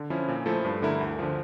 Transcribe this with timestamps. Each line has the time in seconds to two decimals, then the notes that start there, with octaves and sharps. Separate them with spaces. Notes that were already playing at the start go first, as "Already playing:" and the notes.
Already playing: D3
0.10 F3 C#4 E4
0.28 A#2
0.46 F3 A3 E4 A4
0.65 G2
0.82 D3 A3 E4 A#4
1.01 D2
1.19 D3 F3